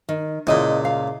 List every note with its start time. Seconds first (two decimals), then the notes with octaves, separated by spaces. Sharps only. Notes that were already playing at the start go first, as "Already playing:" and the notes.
0.09 D#3
0.47 C#2 A#2 E4 D#5
0.85 F5